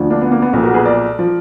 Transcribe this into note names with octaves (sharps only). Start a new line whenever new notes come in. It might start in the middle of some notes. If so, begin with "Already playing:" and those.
Already playing: D2 D3 F3
A#3 D4
B3
A#3
B3
B1 A#2 F3 B3
F#4 A#4
G#4 B4
A#4 D5
F3